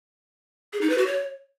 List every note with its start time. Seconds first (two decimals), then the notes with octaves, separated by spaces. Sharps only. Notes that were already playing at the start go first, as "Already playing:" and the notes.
0.73 G#4
0.81 D#4
0.90 B4
0.98 F#4
1.06 C#5